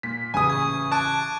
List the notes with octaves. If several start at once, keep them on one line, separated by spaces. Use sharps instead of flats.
A#2 B6
A1 C#3 G#5 D#6
C#6 G#6
A5 D6 F#6 D7